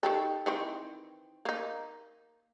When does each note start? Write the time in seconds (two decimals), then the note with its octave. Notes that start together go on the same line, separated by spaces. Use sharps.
0.03 D#3 G4 A4 G5
0.46 D#3 E3 C4
1.45 A#3 D#4